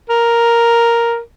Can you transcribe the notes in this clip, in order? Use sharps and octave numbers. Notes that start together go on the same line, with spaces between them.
A#4